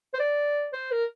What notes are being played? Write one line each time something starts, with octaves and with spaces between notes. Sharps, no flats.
C5
D5
C5
A#4